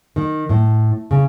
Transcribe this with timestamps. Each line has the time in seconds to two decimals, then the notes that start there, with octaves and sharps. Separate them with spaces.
0.16 D#3
0.49 A2
1.11 C#3